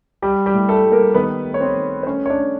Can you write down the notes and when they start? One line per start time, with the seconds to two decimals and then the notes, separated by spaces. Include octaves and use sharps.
0.22 G3 G4
0.46 G3 G4
0.54 A2
0.69 A3 A4
0.84 G3
0.92 A#3 A#4
1.14 D#3 B3 B4
1.45 A3
1.54 C#5
1.60 C4 C5
1.76 D#3
2.03 C5
2.06 A3 C#4 C#5
2.26 C#5
2.30 D4 D5
2.38 A3